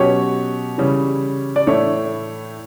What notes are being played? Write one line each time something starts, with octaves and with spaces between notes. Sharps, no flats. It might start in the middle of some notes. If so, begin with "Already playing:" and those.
Already playing: B2 F#3 C#4 G4 C#5
C#3 E3 G3 C#4
D5
A2 E3 A3 E4 C#5